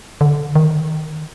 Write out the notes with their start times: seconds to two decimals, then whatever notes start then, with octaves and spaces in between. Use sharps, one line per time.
0.21 D3
0.56 D#3